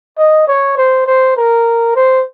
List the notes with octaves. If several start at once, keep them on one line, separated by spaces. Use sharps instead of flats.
D#5
C#5
C5
C5
A#4
C5